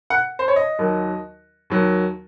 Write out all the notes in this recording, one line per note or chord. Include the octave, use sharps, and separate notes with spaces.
F#5
C5
C#5
D#5
D#2 D#3 F#3
D#2 D#3 F#3